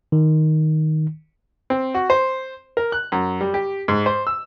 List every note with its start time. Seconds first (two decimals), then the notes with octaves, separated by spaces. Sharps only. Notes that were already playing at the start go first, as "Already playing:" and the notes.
0.12 D#3
1.70 C4
1.94 F#4
2.10 C5
2.77 A#4
2.92 F#6
3.12 F#2
3.41 G3
3.54 G4
3.88 G#2
4.06 C5
4.27 E6